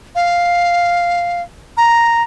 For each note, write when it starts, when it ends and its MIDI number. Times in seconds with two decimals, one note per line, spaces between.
0.15 1.42 77
1.77 2.23 82